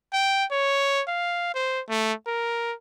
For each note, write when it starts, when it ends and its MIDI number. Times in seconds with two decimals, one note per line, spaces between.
0.13 0.45 79
0.51 1.02 73
1.08 1.52 77
1.55 1.81 72
1.89 2.13 57
2.27 2.74 70